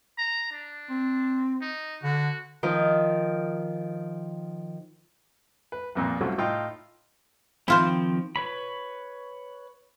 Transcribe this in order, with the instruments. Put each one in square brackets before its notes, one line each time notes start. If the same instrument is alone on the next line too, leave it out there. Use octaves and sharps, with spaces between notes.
[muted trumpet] A#5
D4
[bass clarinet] C4
[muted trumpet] D#4
[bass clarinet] D3 [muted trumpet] F#4
[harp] D#3 F3
[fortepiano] B4
A1 F2 A#2
C2 F#3 A3 C#4 F4 C5
A2 D#4 F4 G5
[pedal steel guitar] D#3 F3 C4 [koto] E4 F4 C5
[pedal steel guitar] B4 C#5 B5